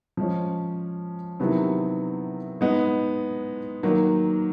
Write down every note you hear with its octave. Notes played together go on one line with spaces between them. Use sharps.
F3 G#3 C#4
C3 D#3 F#3 B3 E4
G#3 B3 D#4
D#3 F#3 A#3